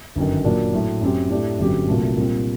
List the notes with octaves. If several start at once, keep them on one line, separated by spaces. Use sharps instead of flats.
G1 F#2 D#3
A#2 F#3 A#3 D4
A2 F#3 A3
F#2 F#3 C4 G4
A2 A3 D4 G4
G1 F#2 F#3 C4 G4
C2 A#2 F#3 A3
A#2 G3 C4